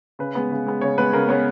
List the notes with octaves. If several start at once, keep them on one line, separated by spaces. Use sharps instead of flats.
C#3 B4
G#3 B3
C#3
G#3 B3
C#3 C#5
G#3 B3 B4
C#3 A#4
G#3 B3 C#5